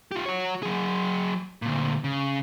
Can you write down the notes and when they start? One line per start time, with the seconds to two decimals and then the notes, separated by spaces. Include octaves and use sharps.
0.12 F4 G4
0.26 F#4 C#5
0.63 F#3 G#4
1.62 D2 A#2
2.04 C#3